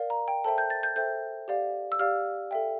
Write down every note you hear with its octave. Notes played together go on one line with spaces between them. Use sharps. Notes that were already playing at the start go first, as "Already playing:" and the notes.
Already playing: A#4 D5 F5
A#5
G5
A4 C5 E5 G5 A5
G6
A6
G6
A4 C5 E5 G5 G6
G4 D5 F5
E6
G4 D5 F5 F6
A4 E5 G5